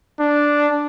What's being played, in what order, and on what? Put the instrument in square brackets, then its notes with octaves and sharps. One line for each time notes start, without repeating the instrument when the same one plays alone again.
[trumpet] D4